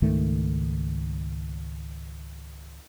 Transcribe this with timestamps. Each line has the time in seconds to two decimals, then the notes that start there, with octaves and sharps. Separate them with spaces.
0.02 C#2 G#2 D#3 A3